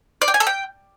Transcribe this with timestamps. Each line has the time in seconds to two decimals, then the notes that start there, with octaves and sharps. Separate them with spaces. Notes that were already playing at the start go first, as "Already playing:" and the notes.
0.22 D5
0.28 G5
0.34 G#5
0.40 A4
0.47 G5